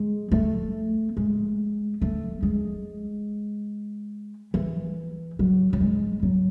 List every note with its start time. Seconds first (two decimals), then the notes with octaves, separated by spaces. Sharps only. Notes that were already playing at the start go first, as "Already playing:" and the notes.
Already playing: G#3
0.31 A3
1.17 G#3
2.02 A3
2.43 G#3
4.54 E3
5.39 F#3
5.73 F#3
5.80 G#3
6.23 F#3